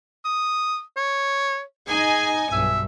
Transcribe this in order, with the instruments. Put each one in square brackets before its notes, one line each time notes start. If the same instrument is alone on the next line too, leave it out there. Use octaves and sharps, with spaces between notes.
[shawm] D#6
C#5
[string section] D#4 D#5 G#5 [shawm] G#4
[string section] B1 G2 [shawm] E5